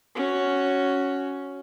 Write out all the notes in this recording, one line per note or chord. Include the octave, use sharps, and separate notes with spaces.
C#4 F#4